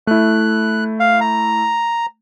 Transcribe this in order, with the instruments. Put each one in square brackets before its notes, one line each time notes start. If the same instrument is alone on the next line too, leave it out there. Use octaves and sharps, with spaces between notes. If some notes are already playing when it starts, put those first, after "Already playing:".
[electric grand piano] A3 E4 [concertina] F#6
[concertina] F5
A#5